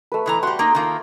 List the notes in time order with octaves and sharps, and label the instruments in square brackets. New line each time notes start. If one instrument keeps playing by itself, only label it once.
[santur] A3 B4
[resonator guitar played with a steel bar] B2 E3 A#5
[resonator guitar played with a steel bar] G3 F#4 [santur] C6
[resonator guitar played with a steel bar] A#3 D#4
D#3 A#3 F4